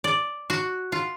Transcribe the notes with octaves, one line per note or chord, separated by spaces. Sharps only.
D5
F#4
F4